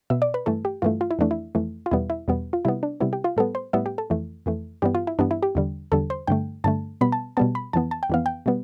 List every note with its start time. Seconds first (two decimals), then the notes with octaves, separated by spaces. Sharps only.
0.10 B2 B3 E5
0.22 D5
0.34 B4
0.46 G2 E3 A3 A4
0.65 G4
0.82 G2 E3 A3 F4
1.01 F4
1.11 E4
1.19 F2 E3 A3 D4
1.31 E4
1.55 F2 E3 A3
1.86 F4
1.91 E2 B2 G3 B3 E4
2.10 E4
2.28 E2 B2 G3 B3
2.53 F4
2.65 C3 G3 B3 E4
2.83 D4
3.00 C3 G3 B3 E4
3.13 G4
3.24 F4
3.37 A2 G3 B3 A4
3.55 C5
3.73 A2 G3 B3 E5
3.86 G4
3.98 A4
4.10 F2 E3 A3
4.46 F2 E3 A3
4.82 G2 E3 G3 B3 G4
4.95 F4
5.07 E4
5.19 G2 E3 G3 B3 D4
5.31 E4
5.43 G4
5.55 E2 D3 G3
5.92 E2 D3 G3 A4
6.10 C5
6.27 G2 D3 A3 G5
6.64 G2 D3 A3 A5
7.01 B2 G3 B3 B5
7.12 A5
7.37 B2 G3 B3 A5
7.55 B5
7.73 F2 E3 B3 A5
7.91 A5
8.03 G5
8.10 F2 E3 B3 F5
8.26 G5
8.46 B2 G3 B3